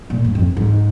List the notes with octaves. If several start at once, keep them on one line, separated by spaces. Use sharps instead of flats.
A#2
G#2
F2
G#2